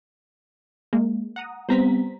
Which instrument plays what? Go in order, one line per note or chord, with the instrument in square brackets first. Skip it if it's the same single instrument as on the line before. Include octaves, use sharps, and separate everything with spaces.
[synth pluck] G#3 A#3
F#5 A#5 D#6
[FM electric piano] G3 B3 C4 [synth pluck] C5 A#5 B6